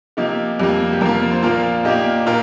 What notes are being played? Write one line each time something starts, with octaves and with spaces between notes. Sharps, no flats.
C3 F3 A#3 D#4 G4
F2 C3 G3 A#3
G4
F2 F3 A#3 F4 A#4
C5
A#2 F3 A#3 F4 A#4
A#2 A#3 D#4 G4
A#2 F4 A#4